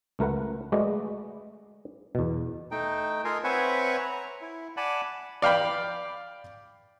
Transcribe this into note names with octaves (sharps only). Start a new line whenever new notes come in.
C#2 A3 A#4 B4 F#5
G#3 A3 F#4 B4 D5 D#5
E2 B2
A3 D#4 G5
F4 A4 A#4 D#5 F5 G#5
C4 B4 C#5 E5 F#5 G#5
A#5
E4
D5 F#5 G#5 A5 B5
D5 F5 G5 B5